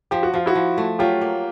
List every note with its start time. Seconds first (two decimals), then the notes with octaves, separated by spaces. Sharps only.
0.11 F3 G4
0.23 F#4
0.34 F3 F4
0.46 E4 F#4
0.55 F3
0.78 A3
0.99 F#3 F4 G4
1.21 A#3